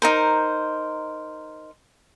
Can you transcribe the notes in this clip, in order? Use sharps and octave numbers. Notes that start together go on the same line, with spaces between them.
D#4 A#4 C5